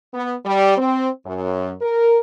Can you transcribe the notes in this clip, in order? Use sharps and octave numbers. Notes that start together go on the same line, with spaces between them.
B3
G3
C4
F#2
A#4